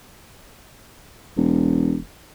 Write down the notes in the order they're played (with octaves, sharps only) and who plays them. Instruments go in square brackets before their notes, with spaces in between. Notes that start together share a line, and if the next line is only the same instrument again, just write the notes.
[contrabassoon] E1